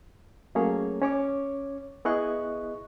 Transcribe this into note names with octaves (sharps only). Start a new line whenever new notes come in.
F#3 A3 A#3 C#4 G#4 C#5
C#4 C#5 D6
B3 E4 G#4 D#5 C#6 F#6